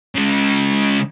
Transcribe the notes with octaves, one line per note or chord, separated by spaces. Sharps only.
C#3 G#3